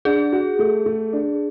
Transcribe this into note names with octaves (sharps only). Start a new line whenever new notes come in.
D4 G#4
F#4
A3
A3
D4